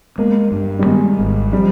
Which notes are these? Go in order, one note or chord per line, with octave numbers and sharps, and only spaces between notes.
G#3 A#3
G2
G3
D#3 G#3
G#1
F3 G3